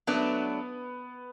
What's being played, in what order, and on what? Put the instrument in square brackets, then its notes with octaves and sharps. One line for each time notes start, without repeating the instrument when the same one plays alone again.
[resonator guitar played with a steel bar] F#3 A3 D4 [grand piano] B3 B4